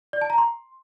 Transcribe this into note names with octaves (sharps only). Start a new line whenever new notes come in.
D5
A5
A#5
C6